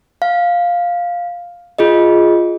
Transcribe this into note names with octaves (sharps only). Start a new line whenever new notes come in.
F5
F4 G#4 D#5